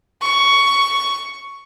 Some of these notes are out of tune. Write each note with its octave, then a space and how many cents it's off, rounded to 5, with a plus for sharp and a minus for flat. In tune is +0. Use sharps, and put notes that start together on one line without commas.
C#6 +10